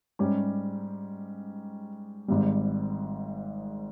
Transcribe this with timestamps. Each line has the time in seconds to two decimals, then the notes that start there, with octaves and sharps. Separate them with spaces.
0.19 G#2 G3 C#4 G4
2.28 G#1 G#2 G3